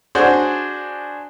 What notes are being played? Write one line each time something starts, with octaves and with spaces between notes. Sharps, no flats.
D4 F#4 G#4 C5